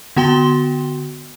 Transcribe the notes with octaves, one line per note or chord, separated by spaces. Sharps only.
D3 B3 F#4 G5 C6 G7